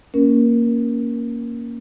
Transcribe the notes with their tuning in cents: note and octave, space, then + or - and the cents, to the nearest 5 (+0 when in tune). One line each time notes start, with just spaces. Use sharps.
A#3 +0 C#4 +0 A#4 +20